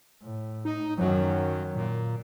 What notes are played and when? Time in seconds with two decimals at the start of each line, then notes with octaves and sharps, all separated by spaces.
0.23 A2
0.65 D#4
0.98 F#2 D#3 F#3
1.76 A#2